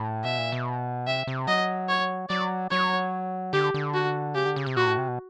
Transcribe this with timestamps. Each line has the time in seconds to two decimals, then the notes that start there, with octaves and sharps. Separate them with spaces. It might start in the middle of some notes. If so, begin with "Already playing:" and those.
Already playing: A2
0.24 B2 E5
0.38 A#2
0.52 B2
1.07 C3 E5
1.27 C3
1.47 F#3 D#5
1.89 C#5
2.29 F#3 D5
2.70 F#3 C#5
3.53 D3 G4
3.74 D3
3.94 F#4
4.35 C#3 G4
4.46 D3
4.56 C#3
4.66 C3
4.76 A#2 F#4
4.87 A2
4.98 C3
5.08 B2